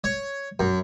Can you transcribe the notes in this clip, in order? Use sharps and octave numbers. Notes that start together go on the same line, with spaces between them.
C#5
F#2